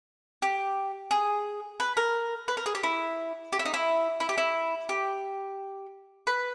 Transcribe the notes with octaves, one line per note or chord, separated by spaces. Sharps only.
G4
G#4
B4
A#4
B4
A#4
G#4
G4
E4
G4
E4
D#4
E4
E4
G4
E4
G4
B4